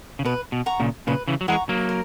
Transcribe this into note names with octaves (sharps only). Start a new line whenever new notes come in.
C#3
B2 B4
B2
F#5 A#5 C#6
A#2 C#3
A#2 C#3 B4
C#3 E3
F#3
E3 G#3 F#5 A#5 C#6
F#3 A#3
A#4